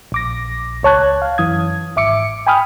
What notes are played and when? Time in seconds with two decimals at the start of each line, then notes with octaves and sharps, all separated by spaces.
0.12 A#1 D6 A#6
0.83 C#2 C#5 A5 F#6 G#6
1.22 F5
1.38 F#2 E3 D#6 G#6
1.96 G#1 E5 D6 C#7
2.47 G5 G#5 B5 D#6 F6